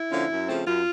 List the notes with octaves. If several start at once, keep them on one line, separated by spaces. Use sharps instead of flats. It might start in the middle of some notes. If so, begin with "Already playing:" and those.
Already playing: E4
D3 F3 A#3 C#4
F#2
C#3 F3 A3 C4
F#2 F4